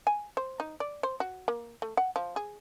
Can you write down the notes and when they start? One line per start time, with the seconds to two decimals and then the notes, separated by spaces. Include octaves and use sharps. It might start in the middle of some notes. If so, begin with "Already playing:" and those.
0.07 G#5
0.37 C5
0.60 D#4
0.80 D5
1.03 C5
1.20 F#4
1.48 A#3
1.82 A3
1.97 F#5
2.16 F3
2.36 G#4